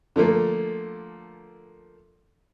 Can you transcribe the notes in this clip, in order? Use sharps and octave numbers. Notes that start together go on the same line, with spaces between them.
D3 F3 A3 A#3